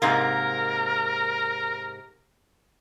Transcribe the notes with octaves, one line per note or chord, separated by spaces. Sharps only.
G#2 C3 A#3 A#4